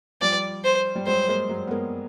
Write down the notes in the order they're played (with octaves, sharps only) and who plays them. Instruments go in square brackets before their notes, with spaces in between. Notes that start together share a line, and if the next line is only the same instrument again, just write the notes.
[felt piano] F3 G3 [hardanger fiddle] D5
[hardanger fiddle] C5
[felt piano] G3
[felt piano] F#3 G#3 [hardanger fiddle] C5
[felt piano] G#3 A#3
F#3 G#3
B3
G#3 A#3